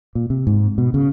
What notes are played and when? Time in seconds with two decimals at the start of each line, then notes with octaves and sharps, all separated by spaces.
0.15 A#2
0.30 C3
0.47 G#2
0.78 B2
0.94 C#3